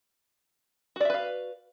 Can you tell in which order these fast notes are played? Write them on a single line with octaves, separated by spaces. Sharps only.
F#4 D5 E5 B4 F5